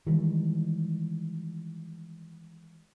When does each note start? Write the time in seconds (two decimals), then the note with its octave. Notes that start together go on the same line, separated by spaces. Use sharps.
0.07 D#3 E3 G3 G#3